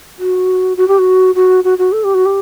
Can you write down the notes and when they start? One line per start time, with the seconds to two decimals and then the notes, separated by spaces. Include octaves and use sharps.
0.19 F#4
0.77 F#4
0.88 G4
0.99 F#4
1.35 F#4
1.64 F#4
1.78 F#4
1.92 A4
2.04 G4
2.14 F#4
2.26 G4